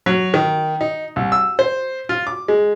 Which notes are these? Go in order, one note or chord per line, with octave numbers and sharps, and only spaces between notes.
F#3
D#3
D#4
C2
E6
C5
F4
D6
G#3